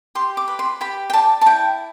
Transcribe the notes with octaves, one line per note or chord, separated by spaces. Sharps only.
G4 C6
D6
B4
C6
G4 B5
G5
D5 A5
A5
E4 G5